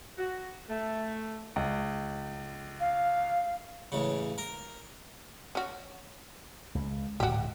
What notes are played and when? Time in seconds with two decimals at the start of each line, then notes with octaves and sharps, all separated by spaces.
0.18 F#4
0.69 A3
1.56 C#2
2.80 F5
3.92 A1 C#3
4.38 A#4
5.55 C#4 F#4
6.75 C#2
7.20 D1 G#2 B2 F#4 G4